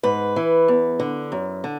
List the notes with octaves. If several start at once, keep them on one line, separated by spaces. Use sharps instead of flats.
G#2 B4
E3
E2
D3
F#2
D3